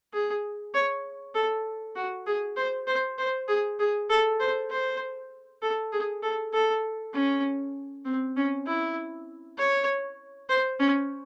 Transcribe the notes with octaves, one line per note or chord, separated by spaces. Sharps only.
G#4
C#5
A4
F#4
G#4
C5
C5
C5
G#4
G#4
A4
C5
C5
A4
G#4
A4
A4
C#4
C4
C#4
E4
C#5
C5
C#4